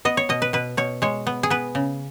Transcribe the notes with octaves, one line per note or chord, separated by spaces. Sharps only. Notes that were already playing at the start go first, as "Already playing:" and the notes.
B3 D#5
C#5
B2 D#5
B4
B2 B4
B2 C#5
G#3 C#5
B3
G#4
B3 B4
C#3